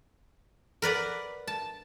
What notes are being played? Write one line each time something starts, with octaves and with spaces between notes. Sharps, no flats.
A#4 B4 D5 F#5
A5